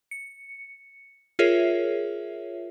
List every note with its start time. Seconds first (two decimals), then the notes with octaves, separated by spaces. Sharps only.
0.11 C#7
1.39 F4 G#4 A#4 C#5 E5